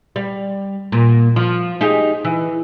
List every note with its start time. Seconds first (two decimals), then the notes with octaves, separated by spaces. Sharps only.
0.16 G3
0.92 A#2
1.36 F3
1.81 D#4 G4 G#4
2.25 E3